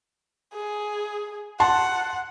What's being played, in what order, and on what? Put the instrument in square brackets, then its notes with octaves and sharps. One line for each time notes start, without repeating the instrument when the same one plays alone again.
[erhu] G#4
[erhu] F#5 [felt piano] A5 C6